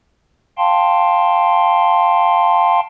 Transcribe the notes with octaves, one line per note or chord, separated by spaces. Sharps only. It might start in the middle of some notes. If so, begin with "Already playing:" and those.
F5 G5 A5 C6